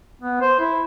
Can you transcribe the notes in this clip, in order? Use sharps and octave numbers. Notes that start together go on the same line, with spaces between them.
B3
C5
E4